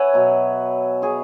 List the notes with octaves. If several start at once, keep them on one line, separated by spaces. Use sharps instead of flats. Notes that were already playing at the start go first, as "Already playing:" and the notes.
Already playing: B4 C#5 E5 F#5 G#5
B2 F#3
G#4 C#5